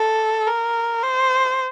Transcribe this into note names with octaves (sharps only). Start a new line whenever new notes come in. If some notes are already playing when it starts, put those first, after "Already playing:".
Already playing: A4
A#4
C5